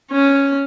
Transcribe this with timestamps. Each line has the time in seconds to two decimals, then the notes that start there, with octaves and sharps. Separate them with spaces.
0.11 C#4